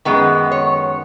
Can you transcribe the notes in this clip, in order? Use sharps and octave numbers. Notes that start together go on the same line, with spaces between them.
F#2 D#3 G#3 B3
C#5